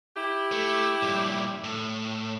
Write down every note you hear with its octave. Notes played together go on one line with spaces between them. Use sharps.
E4 G4
A3
G2 A#2
A2